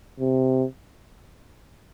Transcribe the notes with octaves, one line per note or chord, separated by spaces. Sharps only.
C3